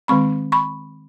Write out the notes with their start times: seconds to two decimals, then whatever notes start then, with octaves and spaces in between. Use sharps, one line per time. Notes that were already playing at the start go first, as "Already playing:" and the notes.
0.08 D#3 G#3 C4 B5 C#6
0.52 B5 C#6